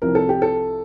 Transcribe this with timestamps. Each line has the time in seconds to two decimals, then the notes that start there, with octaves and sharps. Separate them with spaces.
0.02 C2 C3 F3 A#4
0.15 A4
0.29 G4
0.42 A4